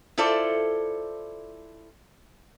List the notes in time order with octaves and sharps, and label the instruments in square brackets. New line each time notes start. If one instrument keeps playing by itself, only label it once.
[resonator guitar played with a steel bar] E4 F4 A4 C5 D5